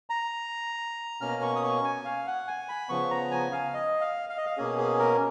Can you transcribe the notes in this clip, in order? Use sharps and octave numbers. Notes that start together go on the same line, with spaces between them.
A#5
B2 A#3 C#4 F6
C#6
D#6
C#6
G#5
F5
F#5
G#5
B5
C#3 F3 B3 C#6
A#5
G#5
F5
D#5
F5
F5
D#5
F5
B2 A#3 C#4 G#4
G#4
A#4